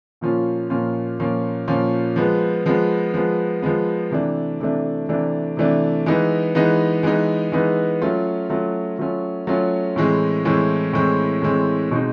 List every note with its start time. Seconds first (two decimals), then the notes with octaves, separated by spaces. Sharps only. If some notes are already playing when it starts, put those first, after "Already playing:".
0.21 A#2 F3 A#3 C#4 F4
0.70 A#2 F3 A#3 C#4 F4
1.20 A#2 F3 A#3 C#4 F4
1.67 A#2 F3 A#3 C#4 F4
2.16 F3 G#3 B3
2.66 F3 G#3 B3
3.14 F3 G#3 B3
3.62 F3 G#3 B3
4.11 C3 E3 A3 D4
4.60 C3 E3 A3 D4
5.09 C3 E3 A3 D4
5.57 C3 E3 A3 D4
6.06 E3 G#3 B3 D#4
6.55 E3 G#3 B3 D#4
7.03 E3 G#3 B3 D#4
7.52 E3 G#3 B3 D#4
8.02 F#3 A3 C#4 F4
8.49 F#3 A3 C#4 F4
8.99 F#3 A3 C#4 F4
9.47 F#3 A3 C#4 F4
9.96 A2 E3 G#3 C4
10.45 A2 E3 G#3 C4
10.93 A2 E3 G#3 C4
11.42 A2 E3 G#3 C4
11.91 B2 G#3 C4 D#4